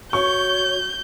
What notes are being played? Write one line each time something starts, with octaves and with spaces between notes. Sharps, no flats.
F#4 C#5 C#6 G6